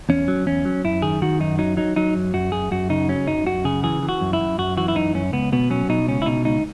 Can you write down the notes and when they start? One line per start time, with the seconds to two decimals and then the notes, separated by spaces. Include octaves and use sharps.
0.09 E2 C#4
0.28 F#3
0.46 E2 C#4
0.65 F#3
0.84 F#2 E4
1.02 D#3 G#4
1.22 D#3 F#4
1.40 F#2 D#4
1.58 F#3 D#4
1.77 F#3 D#4
1.96 F#3 D#4
2.15 F#2
2.34 F#2 F#4
2.52 F#2 G#4
2.71 F#2 F#4
2.90 C#3 D#4
3.09 F#3 C#4
3.27 F#2 D#4
3.46 F#2 F#4
3.64 C#3 G#4
3.83 E3 G#4
4.02 E3
4.09 F#4
4.21 F#2
4.33 E4
4.40 F#2
4.58 F#2 F#4
4.77 E3 F#4
4.88 E4
4.96 F#2 D#4
5.15 F#2 C#4
5.33 C#2 B3
5.52 B2 B3
5.70 F#3 C#4
5.89 B2 D#4
6.08 C#2 C#4
6.22 E4
6.26 B2 D#4
6.45 C#2 D#4